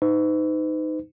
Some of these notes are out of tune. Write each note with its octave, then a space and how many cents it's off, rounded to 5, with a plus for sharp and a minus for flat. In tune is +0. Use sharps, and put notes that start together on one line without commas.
D#4 +0 B4 +45